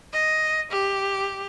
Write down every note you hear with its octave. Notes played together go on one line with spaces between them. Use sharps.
D#5
G4